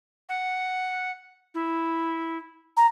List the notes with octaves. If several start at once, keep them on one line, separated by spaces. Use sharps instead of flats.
F#5
E4
A#5